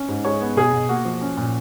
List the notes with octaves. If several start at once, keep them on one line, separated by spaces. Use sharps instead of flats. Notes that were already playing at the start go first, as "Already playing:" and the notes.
Already playing: C#4
G#2
G#3 C#5
B3
B2 G#4
B2
A#3 F#4
F3
C#4
A#2